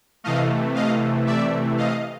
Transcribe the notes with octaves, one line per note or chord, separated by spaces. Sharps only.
C3 E3 A3 D#5 F5
D#5 F5
D5 E5
D#5 F5